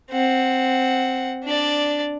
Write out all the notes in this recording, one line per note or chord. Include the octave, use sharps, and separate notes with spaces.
C4 F#5
D4 D5